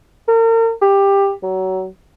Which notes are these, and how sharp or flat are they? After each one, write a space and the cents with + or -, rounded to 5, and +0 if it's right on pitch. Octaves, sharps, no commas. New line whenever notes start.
A#4 -40
G4 +15
F#3 +25